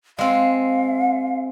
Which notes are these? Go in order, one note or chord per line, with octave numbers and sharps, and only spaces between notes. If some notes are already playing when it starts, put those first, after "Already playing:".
G#3 C4 F5